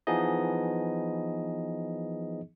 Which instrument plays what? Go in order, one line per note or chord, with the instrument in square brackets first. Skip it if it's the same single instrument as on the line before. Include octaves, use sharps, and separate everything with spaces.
[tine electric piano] E3 F3 B3 D#4 G#4 D#5